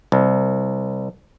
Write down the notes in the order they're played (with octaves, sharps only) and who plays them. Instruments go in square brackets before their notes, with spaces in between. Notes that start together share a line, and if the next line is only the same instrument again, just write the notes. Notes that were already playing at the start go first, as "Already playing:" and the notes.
[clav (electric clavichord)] C2